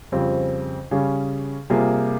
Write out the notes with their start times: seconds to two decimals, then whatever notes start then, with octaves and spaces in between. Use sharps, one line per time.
0.12 F2 C#3 G3 C4
0.91 C#3 G3 C#4 G#4
1.70 C3 G3 A#3 F4 G#4